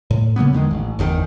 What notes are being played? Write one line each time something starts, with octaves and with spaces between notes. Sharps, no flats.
A2
C#3 F#3 A#3 B3
E2 D3 D#3 G#3
A1
G1 E2 B2 D#3